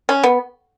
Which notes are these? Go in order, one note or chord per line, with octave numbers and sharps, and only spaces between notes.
C#4
B3